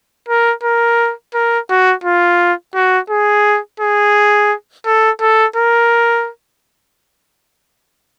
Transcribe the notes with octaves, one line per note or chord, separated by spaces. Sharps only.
A#4
A#4
A#4
F#4
F4
F#4
G#4
G#4
A4
A4
A#4